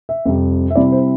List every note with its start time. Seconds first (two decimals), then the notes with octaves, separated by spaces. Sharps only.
0.09 E5
0.25 F2 C3 G3
0.71 E5
0.75 C3 G3 C4 E4 D5
0.92 C5